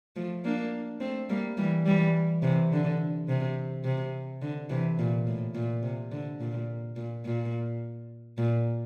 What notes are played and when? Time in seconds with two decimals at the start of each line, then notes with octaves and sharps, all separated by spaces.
0.16 F3 A3
0.45 A#3 D4
1.01 A3 C4
1.29 G3 A#3
1.57 E3 G3
1.86 E3 G3
2.42 C3 E3
2.72 D3
3.28 C3
3.84 C3
4.42 D3
4.70 C3 E3
4.99 A#2
5.27 A2
5.55 A#2
5.83 C3
6.12 D3
6.40 A#2
6.96 A#2
7.25 A#2
8.38 A#2